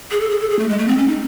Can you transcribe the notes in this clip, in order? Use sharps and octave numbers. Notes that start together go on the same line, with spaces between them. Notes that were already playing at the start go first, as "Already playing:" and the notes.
G#4
A4
G#4
A4
G#4
A3
G#3
A3
C4
C#4
D#4